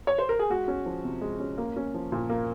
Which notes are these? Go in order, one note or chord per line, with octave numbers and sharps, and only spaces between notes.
C#5
C5
A#4
G#4
G#3 F#4
C#4
F3
C3
G#3
C#4
A#3
C#4
F3
A#2
A#3